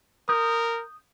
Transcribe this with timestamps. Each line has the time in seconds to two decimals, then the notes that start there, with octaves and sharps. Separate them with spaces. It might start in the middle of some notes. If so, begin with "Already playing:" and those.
0.29 A#4 D#6 G6